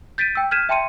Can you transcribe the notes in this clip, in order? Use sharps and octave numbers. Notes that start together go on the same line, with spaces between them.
G6 A6 B6 D7 D#7
G5 E6
F6 G6 G#6 B6 D#7 E7
E5 G5 A5 C6 C#7 D#7